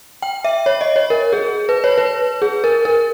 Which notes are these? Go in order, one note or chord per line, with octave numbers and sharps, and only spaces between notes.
G5
E5
C#5
D#5
C#5
A#4
G#4
B4
C#5
B4
G#4
A#4
A#4